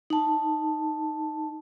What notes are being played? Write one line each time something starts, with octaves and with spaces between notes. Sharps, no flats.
D#4 A5